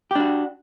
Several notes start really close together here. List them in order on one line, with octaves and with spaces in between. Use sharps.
G4 D4 F#4